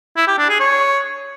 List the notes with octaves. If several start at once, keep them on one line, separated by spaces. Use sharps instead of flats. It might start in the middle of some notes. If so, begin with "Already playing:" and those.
E4
G4
D4
G#4
C#5